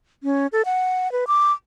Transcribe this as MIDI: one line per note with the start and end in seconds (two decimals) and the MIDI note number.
0.23 0.47 61
0.52 0.62 69
0.65 1.11 78
1.12 1.24 71
1.27 1.52 86